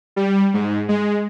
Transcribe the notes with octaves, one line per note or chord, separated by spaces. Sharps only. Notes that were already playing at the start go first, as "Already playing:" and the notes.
G3
G#2
G#3